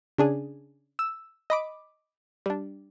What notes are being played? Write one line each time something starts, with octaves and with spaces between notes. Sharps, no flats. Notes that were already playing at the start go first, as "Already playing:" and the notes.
C#3 D4 G#4
E6
D#5 B5 D6
G3 D4